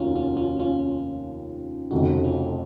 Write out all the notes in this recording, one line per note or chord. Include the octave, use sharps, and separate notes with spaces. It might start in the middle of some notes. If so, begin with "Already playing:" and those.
Already playing: F1 D#2 D#3 C#4 D#4 F4 F#4
C#4 F4
C#4 F4
C#4 F4
F1 F2 C#3 D#4 F#4
C#4 F4